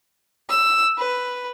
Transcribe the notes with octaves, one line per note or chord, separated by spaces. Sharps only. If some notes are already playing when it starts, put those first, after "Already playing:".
E6
B4